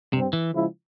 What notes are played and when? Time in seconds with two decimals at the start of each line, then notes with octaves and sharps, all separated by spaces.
0.13 G2 C3 G3 C4
0.33 E3
0.52 C#3 F3 G#3 E4